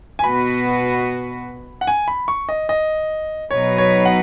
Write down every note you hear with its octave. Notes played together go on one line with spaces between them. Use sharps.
G#5
B2 B3 F#4 B4 B5
F#5
G#5
B5
C#6
D#5
D#5
B2 F#3 D#4 B4 C#5
C#5
F#5